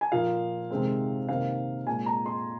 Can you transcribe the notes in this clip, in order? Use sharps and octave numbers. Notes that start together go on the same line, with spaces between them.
G#5
A#2 F3 A#3 F5
C3 D#3 G#3 C4
C3 D#3 A#3 F5
A#2 G#3 C4 G#5
A#5
C6